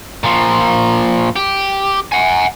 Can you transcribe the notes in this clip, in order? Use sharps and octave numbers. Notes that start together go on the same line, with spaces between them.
A#2 F3
G4
F#5 G#5